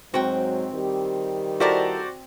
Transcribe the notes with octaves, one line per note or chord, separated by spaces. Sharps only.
G#2 F#3 C4 F#4 G5
D#3 G3 G4
E4 F#4 A4 A#4 C5 D5